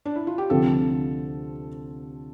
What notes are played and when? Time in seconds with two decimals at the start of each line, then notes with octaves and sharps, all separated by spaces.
0.05 D4
0.16 E4
0.27 F4
0.38 G4
0.50 D2 C3 F3 C4 A4